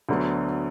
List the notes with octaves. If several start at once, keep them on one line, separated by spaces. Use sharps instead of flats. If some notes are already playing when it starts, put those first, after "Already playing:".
D2 D3 F#3 B3